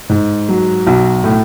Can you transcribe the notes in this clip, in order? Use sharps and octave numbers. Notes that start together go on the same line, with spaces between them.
G#2
F#3
B1
A2